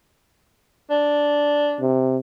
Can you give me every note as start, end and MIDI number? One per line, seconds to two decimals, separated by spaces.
0.90 1.86 62
1.80 2.17 48